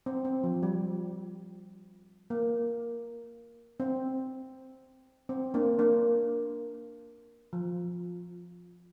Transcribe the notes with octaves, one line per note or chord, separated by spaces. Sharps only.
C4
C4
F3
G3
A#3
C4
C4
A#3 D4
A#3 D4
F3